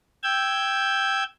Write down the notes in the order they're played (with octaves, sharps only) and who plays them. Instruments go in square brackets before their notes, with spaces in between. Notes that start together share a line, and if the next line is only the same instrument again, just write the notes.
[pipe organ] G5 E6 G6 G#6